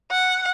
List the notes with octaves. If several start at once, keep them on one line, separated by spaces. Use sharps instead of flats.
F#5